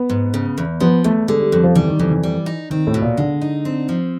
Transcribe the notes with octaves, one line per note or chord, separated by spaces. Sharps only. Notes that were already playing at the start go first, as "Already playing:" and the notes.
Already playing: B3
G#2
C#3
E2
F3 B3
E2 A3
D3 G#3
G3
F2 G3
F3
E3 G3
D#3
F2 E3
E3
G3
D#4
D#3 C4
A2
B2
A#2
D3 G#3
D#4
C4
F3